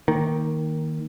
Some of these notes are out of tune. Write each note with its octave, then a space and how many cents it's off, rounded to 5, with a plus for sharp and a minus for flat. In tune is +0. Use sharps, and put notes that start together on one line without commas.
D#3 +10 A#3 +0